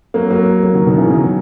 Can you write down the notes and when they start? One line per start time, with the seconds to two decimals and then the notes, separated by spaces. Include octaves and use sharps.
0.14 F#3 A#3
0.30 F#3 A#3
0.63 F#3 A#3
0.74 D#3 F#3
0.86 B2 D#3
0.98 C#3 E3
1.10 D#3 F#3